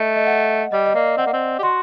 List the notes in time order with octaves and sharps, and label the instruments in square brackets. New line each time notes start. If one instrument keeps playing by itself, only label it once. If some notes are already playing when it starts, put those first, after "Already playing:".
Already playing: [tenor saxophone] A3 [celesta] D#5
[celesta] D#5
F#5
[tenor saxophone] G3 [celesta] D#5
[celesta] D#5
[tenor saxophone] A#3 [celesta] D5
[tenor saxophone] C4 [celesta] F#5
[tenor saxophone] A#3
C4
G4
[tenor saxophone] F#4 [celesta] C6